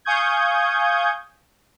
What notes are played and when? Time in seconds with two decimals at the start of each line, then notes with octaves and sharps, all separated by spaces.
0.05 F5 G#5 C#6 D#6 G6 G#6